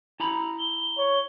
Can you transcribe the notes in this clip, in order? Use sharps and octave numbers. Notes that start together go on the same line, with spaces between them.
E4 A#5 B5
G7
C#5